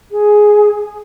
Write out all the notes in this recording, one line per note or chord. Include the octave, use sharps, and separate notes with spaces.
G#4